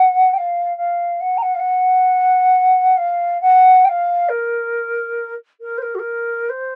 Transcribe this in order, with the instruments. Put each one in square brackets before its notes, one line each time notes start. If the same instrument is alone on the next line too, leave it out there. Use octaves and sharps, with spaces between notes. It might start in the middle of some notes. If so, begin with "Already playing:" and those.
Already playing: [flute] F#5
G5
F5
F5
F#5
A#5
F#5
F5
F#5
F5
F#5
G5
F5
A#4
A#4
C5
A#4
F#4
A#4
C5